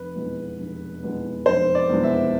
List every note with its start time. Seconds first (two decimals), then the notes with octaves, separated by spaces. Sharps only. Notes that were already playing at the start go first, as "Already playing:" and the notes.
Already playing: F1 B4
0.15 E2 B2 G#3 B3
0.60 F1
1.03 E2 B2 G#3 B3
1.46 F1 C5
1.75 D5
1.90 E2 B2 G#3 B3
2.04 E5